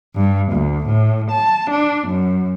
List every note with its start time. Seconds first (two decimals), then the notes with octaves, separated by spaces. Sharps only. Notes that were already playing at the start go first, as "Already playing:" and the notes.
0.16 G2
0.52 D2
0.87 A2
1.29 A5
1.69 D4
2.08 F#2